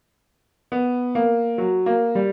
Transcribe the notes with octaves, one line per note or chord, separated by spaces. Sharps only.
B3
A#3
F#3
A#3
G3